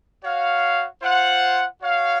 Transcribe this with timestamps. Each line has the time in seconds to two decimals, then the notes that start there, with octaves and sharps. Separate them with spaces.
0.23 F#4 C#5 F5
1.02 F4 C5 F#5
1.81 F#4 C#5 F5